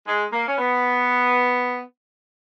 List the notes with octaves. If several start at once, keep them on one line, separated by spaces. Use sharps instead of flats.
G#3
A#3
C#4
B3